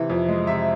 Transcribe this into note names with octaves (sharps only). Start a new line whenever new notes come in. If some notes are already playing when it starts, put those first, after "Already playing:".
Already playing: C3 E3
F2
G#3
C3 E5